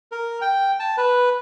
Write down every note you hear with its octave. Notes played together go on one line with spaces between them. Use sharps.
A#4
G5
A5
B4